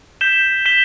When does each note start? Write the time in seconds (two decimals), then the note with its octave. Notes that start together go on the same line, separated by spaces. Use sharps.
0.21 G6 B6 E7 G7
0.65 G6 B6 E7 G7